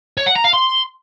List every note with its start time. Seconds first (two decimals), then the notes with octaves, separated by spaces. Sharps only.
0.18 C#5
0.27 F#5
0.36 A#5
0.45 F5
0.54 C6